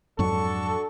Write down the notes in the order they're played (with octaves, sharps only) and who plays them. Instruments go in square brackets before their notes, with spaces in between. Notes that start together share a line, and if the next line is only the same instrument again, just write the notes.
[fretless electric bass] F2 G#2 F#3 [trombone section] D4 F#4 A4 [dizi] C#6